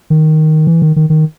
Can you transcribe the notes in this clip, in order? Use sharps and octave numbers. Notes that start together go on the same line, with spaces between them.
D#3
E3
D#3
D#3
D#3